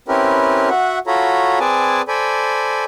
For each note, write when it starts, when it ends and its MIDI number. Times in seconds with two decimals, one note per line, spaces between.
0.08 0.70 60
0.08 0.70 61
0.08 0.70 64
0.08 0.70 67
0.08 0.70 70
0.08 0.70 71
0.70 0.99 66
0.70 0.99 76
0.70 0.99 78
1.07 1.59 65
1.07 1.59 66
1.07 1.59 69
1.07 1.59 73
1.07 1.59 82
1.07 1.59 83
1.60 2.02 60
1.60 2.02 68
1.60 2.02 71
1.60 2.02 74
1.60 2.02 80
1.60 2.02 81
2.08 2.85 69
2.08 2.85 72
2.08 2.85 74
2.08 2.85 80
2.08 2.85 83